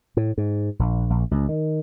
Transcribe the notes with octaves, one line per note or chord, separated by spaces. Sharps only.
A2
G#2
A#1
A#1
C#2
D#3